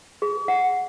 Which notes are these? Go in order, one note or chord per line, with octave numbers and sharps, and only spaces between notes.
G#4
F#5